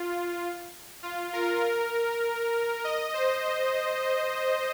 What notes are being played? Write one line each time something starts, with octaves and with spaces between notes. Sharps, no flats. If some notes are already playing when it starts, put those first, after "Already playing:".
Already playing: F4
F4
A#4
D#5
C5